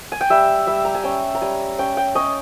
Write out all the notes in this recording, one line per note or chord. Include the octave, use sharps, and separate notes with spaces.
G#5
G5
G3 E5
G3 E5
A#5
G#5
C#4 G5
A#5
G3 G#5
C#4 G5
G5
C#4 D#5